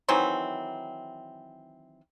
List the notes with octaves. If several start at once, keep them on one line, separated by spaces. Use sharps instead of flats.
D#3 E3 F#3 C4